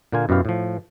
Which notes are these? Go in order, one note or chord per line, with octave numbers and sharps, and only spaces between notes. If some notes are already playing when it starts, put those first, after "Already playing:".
A#2 D3 A#3 F4 G#5
F#2 B2 E4 G4 F5
A2 F3